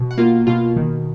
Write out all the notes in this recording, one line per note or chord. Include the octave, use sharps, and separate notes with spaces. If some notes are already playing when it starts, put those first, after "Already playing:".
Already playing: B2
F#5
A#3 F4 F5
B2 F4 F5
D#3